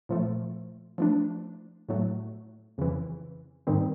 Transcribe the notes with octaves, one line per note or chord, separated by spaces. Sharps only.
A#2 F3 A3
F3 A3 D4
A2 F#3 A3
F2 C#3 E3
G#2 D#3 G3 C4